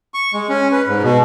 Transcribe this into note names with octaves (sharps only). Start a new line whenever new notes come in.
C#6
G#3
C#4
B4
G#2
B2